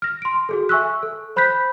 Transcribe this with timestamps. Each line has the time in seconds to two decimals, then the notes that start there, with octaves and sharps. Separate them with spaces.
0.02 F6 A#6
0.22 C6 D7
0.49 F#4 G#4 A4
0.69 E5 G#5 C#6 E6 F#6
1.03 A4
1.36 C5 B5 F#6 G6 B6